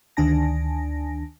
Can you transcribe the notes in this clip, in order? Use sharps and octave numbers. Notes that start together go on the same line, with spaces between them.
D2 D#3 D4 G#5 A5 A#6